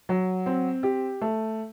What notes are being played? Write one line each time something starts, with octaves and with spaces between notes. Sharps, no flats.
F#3
C4
G4
A3